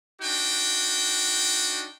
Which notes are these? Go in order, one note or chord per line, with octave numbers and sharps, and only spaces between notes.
D4 D#4 F#4 G5